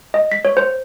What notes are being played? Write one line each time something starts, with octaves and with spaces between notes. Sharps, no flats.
D#5
B6
C#5
C5